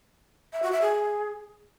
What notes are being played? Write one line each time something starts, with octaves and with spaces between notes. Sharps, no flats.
E5
F#4
E5
G#4